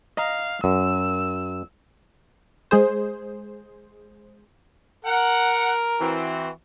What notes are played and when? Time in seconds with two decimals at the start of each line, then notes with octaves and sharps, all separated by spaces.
0.17 D#5 F5 A#5
0.64 F#2 E6
2.71 G#3 G#4 C5
5.05 A#4 F#5
6.00 E3 C4 F#4